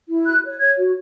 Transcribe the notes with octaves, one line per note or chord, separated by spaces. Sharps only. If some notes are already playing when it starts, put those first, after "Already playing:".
E4
F#4 F#6
C#5
C#5 G#6
F#4